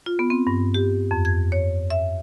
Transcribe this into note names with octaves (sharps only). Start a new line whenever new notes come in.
F4
B3
C4
G2
G4
F2
G#6
C#5
E5